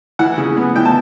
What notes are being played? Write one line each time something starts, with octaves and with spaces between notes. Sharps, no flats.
E3 F#5
C#3
B3
E3 G5
A5